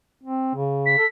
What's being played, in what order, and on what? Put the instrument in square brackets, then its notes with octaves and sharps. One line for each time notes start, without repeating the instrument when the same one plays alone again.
[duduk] C4
C#3
[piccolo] B6
[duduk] A4